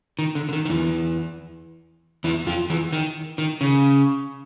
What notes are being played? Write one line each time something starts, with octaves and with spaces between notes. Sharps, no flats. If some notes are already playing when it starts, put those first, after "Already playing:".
D#3
D3
D3
D#3
D#3
E2 E3
E2 E3
F2 F3
E2 E3
D#3
D#3
C#3